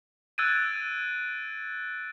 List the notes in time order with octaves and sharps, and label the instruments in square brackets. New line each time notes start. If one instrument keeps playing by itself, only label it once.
[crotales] E6 F#6 G#6 A6 D7 D#7